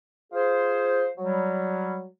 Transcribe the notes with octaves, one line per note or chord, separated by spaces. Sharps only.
F4 G#4 C5
F#3 G3